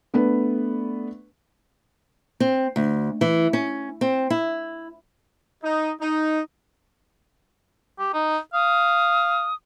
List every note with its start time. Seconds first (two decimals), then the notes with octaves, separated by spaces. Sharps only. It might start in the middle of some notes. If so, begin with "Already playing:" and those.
0.14 A3 B3 D4 B4
2.40 C4
2.76 D2
3.21 E3
3.53 C#4
4.01 C4
4.30 E4
5.64 D#4
6.01 D#4
7.99 G4
8.14 D#4
8.54 F5 D#6